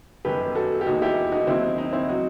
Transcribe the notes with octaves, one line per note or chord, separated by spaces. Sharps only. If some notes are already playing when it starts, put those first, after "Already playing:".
G1 F#2 D#3 G4 B4
F#4 A4
G4
E1 D#2 D#3 D#4 F#4
E4 G4
D#4 F#4
D#2 D#3 F#3 C4 E4
D#4
D#4
C4 E4
F#3 C4 D#4 F#4